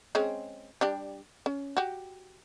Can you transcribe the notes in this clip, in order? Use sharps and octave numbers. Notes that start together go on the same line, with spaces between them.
G#3 C4 C#4
G3 D4 G4
C#4
F#4 G4